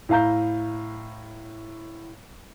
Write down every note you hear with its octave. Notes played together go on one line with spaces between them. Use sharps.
A2 E4 F5 A#5 G6